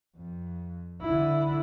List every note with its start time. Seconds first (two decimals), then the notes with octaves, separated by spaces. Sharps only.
0.17 F2
1.02 D3 E4